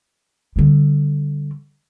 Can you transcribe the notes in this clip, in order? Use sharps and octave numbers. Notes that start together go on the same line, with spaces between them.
D3 G3